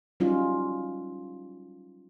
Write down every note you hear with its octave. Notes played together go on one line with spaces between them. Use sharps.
F#3 G3 C#4 D#4 F4